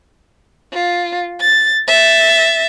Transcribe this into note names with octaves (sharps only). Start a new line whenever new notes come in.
F4
A6
E5 A6